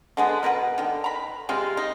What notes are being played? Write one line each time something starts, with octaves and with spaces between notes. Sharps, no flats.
D3 G#3 B3
B2 A#4 B4 F#5
D3 D#3
A#5 B5
C3 G#3 F4
D#4